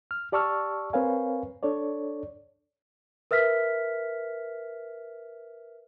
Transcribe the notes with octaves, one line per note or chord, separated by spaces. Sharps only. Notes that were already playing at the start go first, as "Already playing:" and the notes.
F6
G4 D5 A5 C#6 E6 F6
C4 A#4 B4 C#5 F5 G#5
D4 A4 C#5 D5
A#4 B4 E5 F6 B6